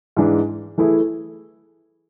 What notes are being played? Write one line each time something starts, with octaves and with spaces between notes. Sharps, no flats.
G#2 E3 G#3 D4
E3 A3 E4 G#4